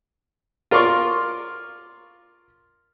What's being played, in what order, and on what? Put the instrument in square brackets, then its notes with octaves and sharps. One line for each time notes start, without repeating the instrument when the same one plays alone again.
[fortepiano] F4 A#4 D5 C6 C#6